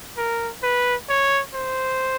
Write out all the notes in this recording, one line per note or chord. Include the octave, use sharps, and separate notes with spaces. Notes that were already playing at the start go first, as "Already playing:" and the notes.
A#4
B4
C#5
C5